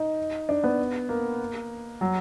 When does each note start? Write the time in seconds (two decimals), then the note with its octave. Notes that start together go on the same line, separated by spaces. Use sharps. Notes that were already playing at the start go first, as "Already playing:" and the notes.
Already playing: D#4
0.49 D4
0.64 B3
1.09 A#3
2.01 F#3